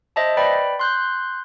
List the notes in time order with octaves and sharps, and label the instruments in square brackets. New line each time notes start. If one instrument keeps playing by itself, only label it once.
[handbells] C5 D#5 E5 A5
B4 D5 G5 B5
C6 F#6 G6